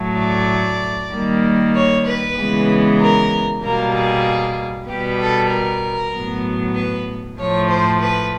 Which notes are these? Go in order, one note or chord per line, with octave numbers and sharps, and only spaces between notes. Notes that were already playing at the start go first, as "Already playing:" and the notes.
Already playing: A2 F#3 A3
D5
D#3 G3 A#3
C#5
B4
C#3 E3 G#3 B3
A#4
B2 G3 A#3 A#4
G#4
B2 G3 B3 G4
A4
A#4
A2 F#3 B3
B4
A2 F3 A3 C#5
C5
B4